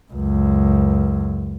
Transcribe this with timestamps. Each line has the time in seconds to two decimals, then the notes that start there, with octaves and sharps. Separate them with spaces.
0.12 C#2 F#2